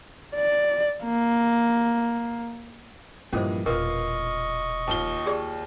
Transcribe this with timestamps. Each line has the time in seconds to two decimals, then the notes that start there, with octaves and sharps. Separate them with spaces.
0.35 D5
1.04 A#3
3.32 G2 A#2 E3 F3 C#4 C5 D#5
3.66 E1 A#2 F4 A#4 B4 D#5 C#6
4.87 D#2 F4 G7
5.26 G4 G#4 D5